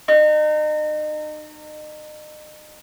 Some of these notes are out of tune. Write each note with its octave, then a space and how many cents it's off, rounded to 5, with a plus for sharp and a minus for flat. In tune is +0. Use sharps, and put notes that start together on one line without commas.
D#4 -35